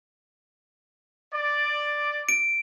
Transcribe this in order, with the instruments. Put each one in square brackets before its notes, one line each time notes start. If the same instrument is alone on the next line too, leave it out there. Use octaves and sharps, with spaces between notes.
[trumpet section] D5
[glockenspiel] D7